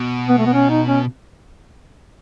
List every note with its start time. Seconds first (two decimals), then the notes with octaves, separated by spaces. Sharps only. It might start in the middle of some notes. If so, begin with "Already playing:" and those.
Already playing: B2
0.29 B3
0.39 A3
0.46 B3
0.54 C#4
0.70 D#4
0.88 C#4